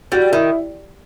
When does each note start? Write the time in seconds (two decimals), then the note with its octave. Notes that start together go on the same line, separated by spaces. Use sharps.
0.12 G3 F#4
0.32 D#3 E4